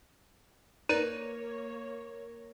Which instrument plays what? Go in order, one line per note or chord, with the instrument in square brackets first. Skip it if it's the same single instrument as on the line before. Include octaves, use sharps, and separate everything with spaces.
[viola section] A#3 C#5 [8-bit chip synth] D#4 B4 D5 [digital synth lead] A#4 [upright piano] D#7